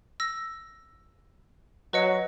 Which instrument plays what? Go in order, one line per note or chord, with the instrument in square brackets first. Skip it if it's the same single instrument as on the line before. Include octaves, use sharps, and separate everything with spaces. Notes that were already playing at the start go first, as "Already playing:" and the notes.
[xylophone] E6 A#6
[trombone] F#3 [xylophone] B4 D#5 C#7